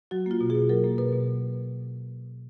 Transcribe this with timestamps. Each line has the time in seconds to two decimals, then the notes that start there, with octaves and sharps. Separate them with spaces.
0.11 F#3 F#4
0.26 A#3 F4
0.41 B2
0.50 G#4
0.55 B2
0.69 F#3 A#4
0.84 A#3
0.98 B2 B4
1.13 B2